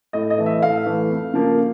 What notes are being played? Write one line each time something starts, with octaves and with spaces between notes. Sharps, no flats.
A2 D#5
D#5
E3 A3
E5
A2 F5
E3 A3
F2
C#3 F3 A#3